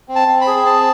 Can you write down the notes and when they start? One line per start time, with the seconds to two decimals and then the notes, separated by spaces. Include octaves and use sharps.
0.09 C4
0.16 A5
0.28 C4
0.41 B5
0.47 G#4
0.65 C4 A5